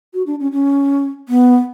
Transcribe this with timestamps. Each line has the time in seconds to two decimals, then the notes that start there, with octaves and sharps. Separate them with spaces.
0.14 F#4
0.27 D4
0.40 C#4
0.52 C#4
1.29 B3